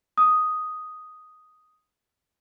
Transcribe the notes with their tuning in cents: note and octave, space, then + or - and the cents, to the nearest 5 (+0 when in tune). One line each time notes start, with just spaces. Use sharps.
D#6 +0